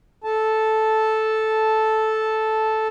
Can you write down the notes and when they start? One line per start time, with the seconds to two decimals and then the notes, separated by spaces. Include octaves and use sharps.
0.24 A4 A5